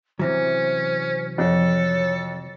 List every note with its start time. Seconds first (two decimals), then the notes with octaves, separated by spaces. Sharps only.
0.19 C3 E3 F#3 C#4 C5
1.38 F2 A4 C#5